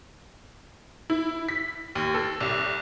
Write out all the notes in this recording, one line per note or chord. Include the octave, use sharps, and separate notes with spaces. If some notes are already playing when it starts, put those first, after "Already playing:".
E4
B6
D#2
A4
C2